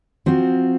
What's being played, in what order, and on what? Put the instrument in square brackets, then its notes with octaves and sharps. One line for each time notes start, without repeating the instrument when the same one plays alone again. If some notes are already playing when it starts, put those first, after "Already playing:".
[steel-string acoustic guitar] F3 C4 F#4